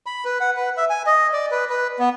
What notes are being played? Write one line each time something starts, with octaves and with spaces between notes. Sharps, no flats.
B5
B4
F#5
B4
E5
G#5
D#5
D5
B4
B4
B3